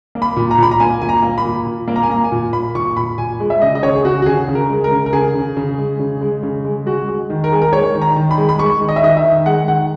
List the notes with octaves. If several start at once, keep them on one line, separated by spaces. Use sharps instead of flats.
A#3
B5
A#2
A#5
A#2 B5
A#5
A#3 G#5
A#2 G#5
A#5
A#3
B5
A#2
A#2
A#3
A#5
G#5
A#3 A#5
G#5
A#2
A#3 B5
A#2 C#6
A#2 B5
A#2 G#5
G#3
E5
C#3 D#5
D#5
C#3 C#5
G#4
C#3 F#4
F#4
C#3 G#4
C#3
A#4
G#3
A#4
C#3
A#4
C#3 G#4
C#3
C#3
G#3
C#3
G#3
C#3
G#3
G#3 F#4
G#3
D#3
A#4
G#3 G#4
A#4
G#3 C#5
D#3
A#5
D#3
B5
G#3
B5
G#3 C#6
D#3
D#5
E5
D#3 D#5
E5
D#3
G#3 F#5
D#3 F#5